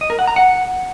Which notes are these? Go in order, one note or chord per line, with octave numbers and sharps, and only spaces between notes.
D#5
A#4
F#5
A#5
F#5